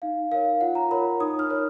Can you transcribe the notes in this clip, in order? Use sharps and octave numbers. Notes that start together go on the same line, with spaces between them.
D#4 F5
A#4 C#5 F5
F4 F#5
A#5
A#4 C#5 B5
D#4 D#6
F6
A#4 C#5